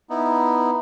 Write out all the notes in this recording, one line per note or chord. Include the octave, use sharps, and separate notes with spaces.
B3 D#4 E4